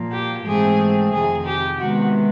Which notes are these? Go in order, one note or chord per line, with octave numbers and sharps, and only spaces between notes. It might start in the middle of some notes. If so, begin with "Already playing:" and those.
Already playing: A#2 F3 A#3
G4
G#2 E3 A3 C4 G#4
F2 C3 D#3 G#4
G4
C3 D#3 G#3 B3 F#4